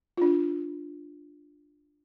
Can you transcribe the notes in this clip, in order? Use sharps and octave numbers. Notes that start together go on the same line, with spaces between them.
D4 F4